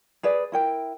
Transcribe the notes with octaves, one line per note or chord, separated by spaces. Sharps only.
G#4 B4 D5
E4 A#4 G5